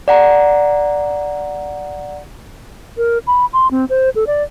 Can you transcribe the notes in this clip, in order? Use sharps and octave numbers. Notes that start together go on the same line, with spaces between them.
D5 F#5 A#5
A#4
B5
C6
C4
C5
A4
D5